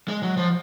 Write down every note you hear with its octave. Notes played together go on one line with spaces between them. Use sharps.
G#3
F#3
F3